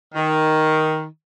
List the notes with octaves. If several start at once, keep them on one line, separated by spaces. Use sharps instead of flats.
D#3